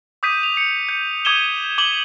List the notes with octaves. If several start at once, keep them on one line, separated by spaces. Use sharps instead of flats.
D6 D#6 G6 B6 D#7
F7
C#7
G6 C#7
D6 D#6 G#6 D#7 E7 G7
D6 F#7 G7